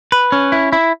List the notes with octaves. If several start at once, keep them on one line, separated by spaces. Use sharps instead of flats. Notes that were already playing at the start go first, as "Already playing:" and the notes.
B4
C#4
E4
E4